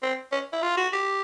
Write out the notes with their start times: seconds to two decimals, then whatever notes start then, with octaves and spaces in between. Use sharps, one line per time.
0.02 C4
0.32 C#4
0.52 E4
0.62 F4
0.77 F#4
0.93 G4